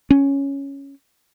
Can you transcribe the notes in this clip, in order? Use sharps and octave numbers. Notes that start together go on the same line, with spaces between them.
C#4